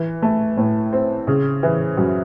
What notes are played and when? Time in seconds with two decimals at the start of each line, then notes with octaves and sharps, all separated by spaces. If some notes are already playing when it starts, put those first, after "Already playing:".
Already playing: E3
0.22 A3
0.57 A2
0.93 C4
1.27 C#3
1.63 E3
1.97 F#2